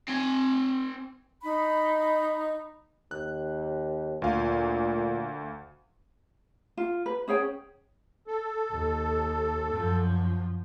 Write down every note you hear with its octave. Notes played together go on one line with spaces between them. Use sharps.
C4 G#5
D#4 B5
D#2 F#6
D2 A#2 F5
F4
B4
C#4 G#4 C#5 G5
A4
D#2
F#2 F3